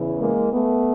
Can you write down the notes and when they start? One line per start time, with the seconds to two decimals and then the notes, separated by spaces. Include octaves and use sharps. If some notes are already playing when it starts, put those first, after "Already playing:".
Already playing: E2 C#3 E3
0.19 G#3 A#3
0.51 A3 B3